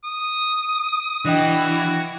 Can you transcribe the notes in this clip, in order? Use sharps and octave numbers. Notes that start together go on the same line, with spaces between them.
D#6
E3 D4 F#4 D#5 G5